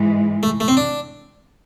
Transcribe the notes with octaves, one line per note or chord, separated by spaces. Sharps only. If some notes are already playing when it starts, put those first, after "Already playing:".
Already playing: G#2 E3 G#3
A3
A3
C4
D4